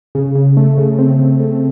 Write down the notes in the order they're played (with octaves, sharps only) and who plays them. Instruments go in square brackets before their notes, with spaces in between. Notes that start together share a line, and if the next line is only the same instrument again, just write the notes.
[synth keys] C#3
C#3
A3
C#3
C4
C#3
A3